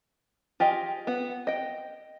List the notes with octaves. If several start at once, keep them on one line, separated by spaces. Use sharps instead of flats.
F4 G4 G#4 D#5
B3 F#5
D#5 G5